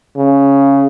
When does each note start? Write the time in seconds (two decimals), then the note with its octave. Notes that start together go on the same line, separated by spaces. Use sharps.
0.17 C#3